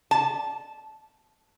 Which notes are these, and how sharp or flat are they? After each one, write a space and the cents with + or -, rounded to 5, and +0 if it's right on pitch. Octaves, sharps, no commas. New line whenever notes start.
A5 -15